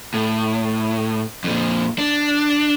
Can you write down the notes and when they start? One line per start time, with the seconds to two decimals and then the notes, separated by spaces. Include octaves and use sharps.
0.14 A2
1.44 F2 A#2
1.98 D4